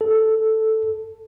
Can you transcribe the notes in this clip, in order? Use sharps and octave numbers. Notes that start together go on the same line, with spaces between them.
A4